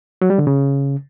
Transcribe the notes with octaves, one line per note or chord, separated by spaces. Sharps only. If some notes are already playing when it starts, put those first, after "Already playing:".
F#3
G3
D3
C#3